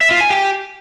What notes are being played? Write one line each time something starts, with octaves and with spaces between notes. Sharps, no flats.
E5
F4
G#5
G4